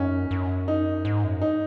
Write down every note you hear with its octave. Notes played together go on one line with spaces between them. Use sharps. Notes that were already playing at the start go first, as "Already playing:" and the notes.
Already playing: F#2 C#4 D#4
F#2
D#4
G#2
F#2
D#4